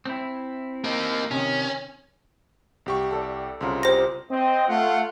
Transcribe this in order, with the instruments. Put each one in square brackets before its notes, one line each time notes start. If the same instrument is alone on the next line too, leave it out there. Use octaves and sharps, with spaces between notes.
[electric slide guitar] C4 E4
[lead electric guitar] A#3 D#4
[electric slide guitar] C3 D#3 [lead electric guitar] C#4
[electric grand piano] C2 G4 C#6
[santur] A4 D5
[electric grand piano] C2 C#3 [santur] F4 A#4 C5
[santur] G4 G#5 [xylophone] C5 A#6
[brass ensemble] C4 D#5
A3 F4 F#5